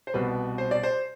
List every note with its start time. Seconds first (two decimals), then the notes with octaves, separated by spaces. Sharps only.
0.07 C5
0.14 C2 B2 G3 B4
0.58 C5
0.71 D5
0.83 C5